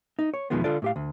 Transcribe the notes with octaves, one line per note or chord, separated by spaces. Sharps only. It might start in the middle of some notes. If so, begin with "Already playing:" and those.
D#4
C#5
E2 B2 D#3 F3 G#3 B3
D3 F4 A4 D5
A2 G4 F5
D2